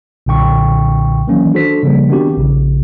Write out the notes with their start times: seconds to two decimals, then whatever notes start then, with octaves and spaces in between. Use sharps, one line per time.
0.26 B1 A#2 D3 G5 C#6
1.27 D#3 E3 F#3 A#3 C#4
1.54 D4 F#4 A4 C5 B6
1.83 C#3 F3 G3 A#3
2.09 D#3 B3 C4 D4 F#4 G4
2.37 A#1 C#3